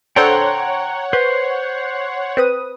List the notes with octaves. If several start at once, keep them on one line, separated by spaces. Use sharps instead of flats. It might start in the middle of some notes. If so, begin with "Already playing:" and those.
D4 A4 C5 C#5 F#5 G5 A#5 C6
B4 C5
C4 B4 D#6